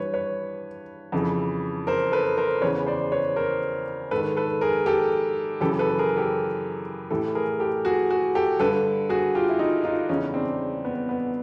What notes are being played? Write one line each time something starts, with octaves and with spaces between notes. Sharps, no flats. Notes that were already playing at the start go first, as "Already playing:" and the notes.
Already playing: G2 E3 B4 C#5
B4 C#5
F2 C#3 E3
A#4 C5
A4 B4
A#4 C5
E2 C#3 E3 B4 C#5
C5 D5
B4 C#5
A#4 C5
G#2 D#3 A4 B4
A4 B4
G#4 A#4
G4 A4
F#2 C#3 E3 G4 A4
A4 B4
G#4 A#4
G4 A4
A2 E3 G4 A4
G#4 A#4
G4 A4
F#4 G#4
F#4 G#4
G4 A4
G2 D3 A4 B4
F#4 G#4
F4 G4
E4
D#4 F4
D#4 F4
E2 C#3 E3 C#4 D#4
C4 D4
B3
B3